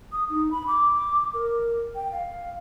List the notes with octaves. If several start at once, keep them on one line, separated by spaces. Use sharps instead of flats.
D#6
D#4
B5
D6
A#4
G5
F5